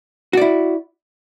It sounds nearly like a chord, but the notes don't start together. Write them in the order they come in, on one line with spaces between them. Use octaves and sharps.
F#4 D5 E4